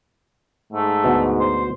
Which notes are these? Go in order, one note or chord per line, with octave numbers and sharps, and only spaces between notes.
G#2 A3
D2 B2
C5